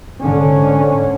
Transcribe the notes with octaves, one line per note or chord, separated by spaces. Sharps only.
G#2 D3 C#4